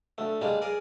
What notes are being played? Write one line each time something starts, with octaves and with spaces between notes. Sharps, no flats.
D2 A3
G3 G#3 A#3 D4
G#4 A#4 D5